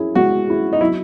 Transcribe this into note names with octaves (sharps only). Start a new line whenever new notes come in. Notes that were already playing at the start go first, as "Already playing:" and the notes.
Already playing: C#4 E4 G#4
G#3 F#4
C#4 E4 G#4
D#4
F#3 E4